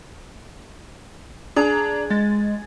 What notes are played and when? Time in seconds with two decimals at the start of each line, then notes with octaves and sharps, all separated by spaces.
1.56 D4 G#4 A#5
2.10 G#3 A6